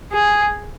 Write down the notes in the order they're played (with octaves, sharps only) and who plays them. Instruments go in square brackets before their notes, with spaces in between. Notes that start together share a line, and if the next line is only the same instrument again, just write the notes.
[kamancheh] G#4